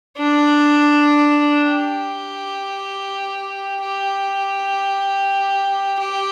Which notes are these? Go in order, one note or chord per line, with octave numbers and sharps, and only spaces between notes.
D4
G4
G4
G4